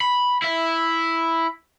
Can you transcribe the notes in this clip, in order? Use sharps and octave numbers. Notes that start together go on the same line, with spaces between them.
B5
E4 E5